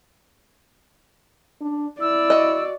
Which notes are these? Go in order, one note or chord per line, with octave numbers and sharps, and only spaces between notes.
D4
E4 D5 E6
F#4 D#5